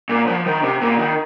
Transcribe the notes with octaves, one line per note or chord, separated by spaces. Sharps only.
A#2
F3
D#3
C3
A#2
D#3